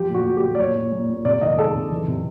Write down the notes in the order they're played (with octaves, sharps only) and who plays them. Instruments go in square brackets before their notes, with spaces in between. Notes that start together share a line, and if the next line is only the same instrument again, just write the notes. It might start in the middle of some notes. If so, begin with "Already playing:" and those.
Already playing: [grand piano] F3 G4
A#2
F#4
A#2
G4
A#2
D5
A#2 C#5
A#2
A#2
A#2
C3 D5
D#3 D#5
G#3 A4
C3
E3
C3